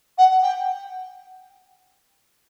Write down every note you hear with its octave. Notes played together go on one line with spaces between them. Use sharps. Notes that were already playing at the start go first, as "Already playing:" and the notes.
F#5
G5